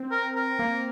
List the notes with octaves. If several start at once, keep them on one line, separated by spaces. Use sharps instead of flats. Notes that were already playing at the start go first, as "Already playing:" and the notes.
Already playing: C4
A#4
A#4
A#3